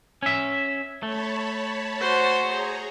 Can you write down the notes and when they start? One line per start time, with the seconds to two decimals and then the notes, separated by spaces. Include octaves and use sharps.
0.23 C#4 E5
1.03 A3 C#5 A5 B5
1.99 F#4 C5
2.40 G#4 C#5 A#5